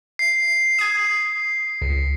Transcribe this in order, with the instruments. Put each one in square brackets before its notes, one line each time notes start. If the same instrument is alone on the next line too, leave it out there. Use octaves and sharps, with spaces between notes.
[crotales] C7
[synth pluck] D#6 G#6
C#2